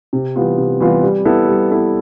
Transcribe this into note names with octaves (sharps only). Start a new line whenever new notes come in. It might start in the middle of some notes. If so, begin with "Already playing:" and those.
C3
E3 G3 B3 F4
C3
E3 G3 B3 F4
G3
B3 E4 A4
G3
B3 E4 A4